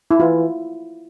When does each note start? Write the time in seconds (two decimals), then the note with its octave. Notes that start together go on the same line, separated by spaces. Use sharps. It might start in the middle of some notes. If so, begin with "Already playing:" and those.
0.11 E4
0.20 E3 F4